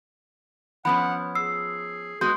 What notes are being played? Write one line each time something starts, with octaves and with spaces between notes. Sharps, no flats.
F3 B3 C#4 F#5 B5
G#4 E6 C7
G#3 B3 F#4 C6 G6